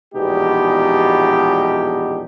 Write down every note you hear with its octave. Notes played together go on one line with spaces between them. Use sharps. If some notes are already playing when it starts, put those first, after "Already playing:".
A#1 E2 B2 G#3 D#4 G4